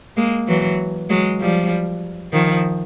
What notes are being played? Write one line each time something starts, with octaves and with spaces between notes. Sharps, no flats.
G#3 A#3
E3 F#3
F#3 G#3
F3 G3
D#3 F3